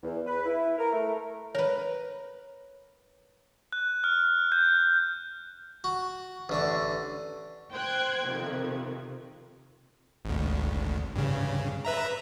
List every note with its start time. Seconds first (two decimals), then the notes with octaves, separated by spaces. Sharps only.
0.03 E2
0.26 B4
0.46 E4
0.78 A#4
0.92 A3
1.55 A#4 B4 C#5
3.72 F#6
4.04 F6
4.52 G6
5.84 F#4
6.49 A1 D3 C#6
7.72 C5 G5 F#6 G#6
8.26 F2 C3 D#3
10.25 G#1 D2
11.16 G2 C#3
11.85 B4 E5 A#5